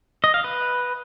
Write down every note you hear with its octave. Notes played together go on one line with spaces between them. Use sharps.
D#5
F5
B4